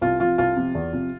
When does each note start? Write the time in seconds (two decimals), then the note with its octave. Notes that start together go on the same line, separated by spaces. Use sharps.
0.01 C2 F4
0.20 C3 F3 F4
0.38 C2 F4
0.56 C3 F3
0.75 E2
0.93 C3 F3